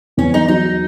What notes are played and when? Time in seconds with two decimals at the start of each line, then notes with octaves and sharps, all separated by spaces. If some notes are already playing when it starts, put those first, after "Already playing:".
0.17 E2 C#4
0.34 D#4
0.48 F#3 D#4